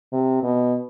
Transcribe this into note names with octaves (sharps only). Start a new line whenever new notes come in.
C3
B2